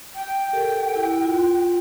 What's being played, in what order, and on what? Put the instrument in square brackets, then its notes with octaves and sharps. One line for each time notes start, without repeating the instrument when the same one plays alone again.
[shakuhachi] G5
[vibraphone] G4 A4 A#4
E4
F4